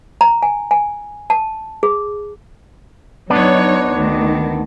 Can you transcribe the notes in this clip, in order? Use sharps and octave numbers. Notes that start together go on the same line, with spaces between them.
A#5
G#5
G#5
A5
G#4
F#3 B3 D4 D#4 C#5
D2 D#3